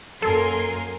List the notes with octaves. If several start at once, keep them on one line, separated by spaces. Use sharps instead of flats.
F#2 A#3 A4 A#4 G#5 C6